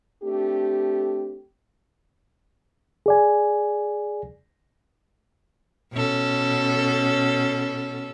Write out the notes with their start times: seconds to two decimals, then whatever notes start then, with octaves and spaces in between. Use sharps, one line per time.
0.22 A3 C4 D4 G4
3.06 G#4 D5 G#5
5.93 B2 C#4 A4